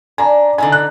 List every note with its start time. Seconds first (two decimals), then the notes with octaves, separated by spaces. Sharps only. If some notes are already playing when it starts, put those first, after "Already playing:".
0.18 D4 G#5 A#5
0.58 D3 E3 D#4 G#5
0.72 F#6